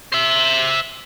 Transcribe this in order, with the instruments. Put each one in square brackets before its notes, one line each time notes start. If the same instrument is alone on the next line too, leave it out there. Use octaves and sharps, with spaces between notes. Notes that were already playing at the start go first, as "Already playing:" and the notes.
[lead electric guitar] C5 E5